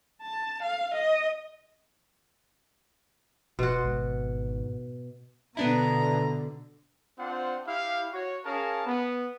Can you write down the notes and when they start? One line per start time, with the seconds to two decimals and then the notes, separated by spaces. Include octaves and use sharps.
0.22 A5
0.63 F5
0.94 D#5
3.59 E1 B2 F#4 C6
3.84 G#1 G#2
5.57 B2 D3 B3 D4 E4 A#5
7.18 C4 D4 F4 C5 F#5
7.66 E4 G4 F5
8.13 F#4 C#5
8.44 C#4 G#4 A#4 F5 A5
8.84 B3